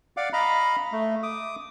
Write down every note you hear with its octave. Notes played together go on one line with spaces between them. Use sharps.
D5 F5 F#5 D6
D#5 F5 A#5 B5
A3
D6 D#6